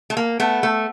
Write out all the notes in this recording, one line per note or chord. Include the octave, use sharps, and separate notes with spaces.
A3
A#3
A3 B3
A3